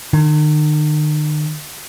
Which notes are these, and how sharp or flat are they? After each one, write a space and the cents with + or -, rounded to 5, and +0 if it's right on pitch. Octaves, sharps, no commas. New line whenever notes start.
D#3 -45